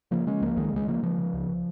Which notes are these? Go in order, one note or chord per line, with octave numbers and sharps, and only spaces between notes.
C#3 F3 A#3
C#3 G#3 C#4
C#2 F3 A#3
C#2 D#3 G#3
C#3 G#3
C#3 F3 A#3
C#3 F3
C#3
C#2